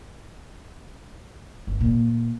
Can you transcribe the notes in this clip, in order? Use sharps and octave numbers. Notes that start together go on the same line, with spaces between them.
G1
A#2